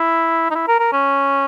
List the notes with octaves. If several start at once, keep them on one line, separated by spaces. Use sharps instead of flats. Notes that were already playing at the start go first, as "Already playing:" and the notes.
Already playing: E4
D#4
E4
A#4
A#4
C#4